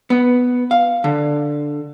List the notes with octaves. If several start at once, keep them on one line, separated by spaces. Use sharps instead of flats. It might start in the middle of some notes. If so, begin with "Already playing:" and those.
B3
F5
D3